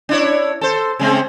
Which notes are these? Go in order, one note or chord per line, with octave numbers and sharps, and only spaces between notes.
D4 E4 C#5
A4 C5
C#3 G#3 C4